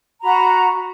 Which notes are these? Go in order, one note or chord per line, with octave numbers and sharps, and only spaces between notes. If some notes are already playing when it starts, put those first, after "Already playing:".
F#4 A#5 B5